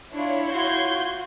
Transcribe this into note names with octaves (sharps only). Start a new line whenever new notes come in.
D4 E4 F4 C#5
F4 F#4 C6 G6 G#6